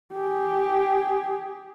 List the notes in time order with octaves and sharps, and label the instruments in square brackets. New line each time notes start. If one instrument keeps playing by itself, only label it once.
[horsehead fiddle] G4 G#4